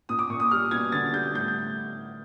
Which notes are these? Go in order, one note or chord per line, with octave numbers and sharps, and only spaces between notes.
A#2 D#6
D6
A#2 C#6
D#6
G3 F6
B2 G#6
D3 A6
G3 G6
A2 G6
G6